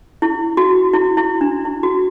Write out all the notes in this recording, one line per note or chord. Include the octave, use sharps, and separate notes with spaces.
E4
F#4
E4
E4
D4
E4
F#4